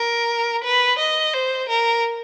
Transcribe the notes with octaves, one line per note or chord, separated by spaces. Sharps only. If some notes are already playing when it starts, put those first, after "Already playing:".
Already playing: A#4
B4
D#5
C5
A#4